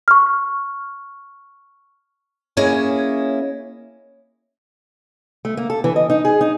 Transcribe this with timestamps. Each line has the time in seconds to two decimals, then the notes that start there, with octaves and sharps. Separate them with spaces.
0.08 C#6 F6
2.57 A#3 C#4 E4 G#4 C#5 D#5
5.45 A3
5.57 A#3
5.70 A4
5.84 E3
5.96 D#5
6.10 D#4
6.25 G#4
6.41 D#4